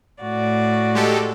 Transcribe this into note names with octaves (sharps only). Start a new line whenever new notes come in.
A2 F#4 D5
G#3 G4 A4